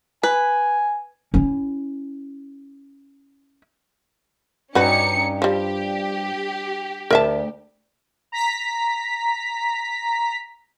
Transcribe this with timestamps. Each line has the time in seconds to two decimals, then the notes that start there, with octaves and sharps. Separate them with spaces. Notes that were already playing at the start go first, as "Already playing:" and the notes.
0.23 B4 G#5
1.34 C#4 E4
4.75 G2 C#4 D#4 F#4 B4 C#7
5.42 F3 G3 G4
7.10 D2 A#4 E5 A5
8.32 A#5 B6